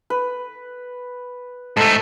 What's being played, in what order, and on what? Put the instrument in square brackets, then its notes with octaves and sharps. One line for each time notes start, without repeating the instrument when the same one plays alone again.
[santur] B4
[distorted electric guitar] G#2 A3 [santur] A4